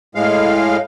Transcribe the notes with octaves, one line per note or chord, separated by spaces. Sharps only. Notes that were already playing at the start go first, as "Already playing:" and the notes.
A2 G#3 F5